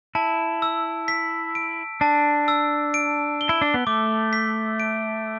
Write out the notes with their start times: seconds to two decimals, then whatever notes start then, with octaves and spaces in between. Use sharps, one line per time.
0.15 E4 A5
0.62 E6
1.08 B6
1.55 D7
2.01 D4 A5
2.48 E6
2.94 D7
3.41 G7
3.49 E4
3.62 D4
3.74 B3
3.87 A3 D6
4.33 B6
4.80 D7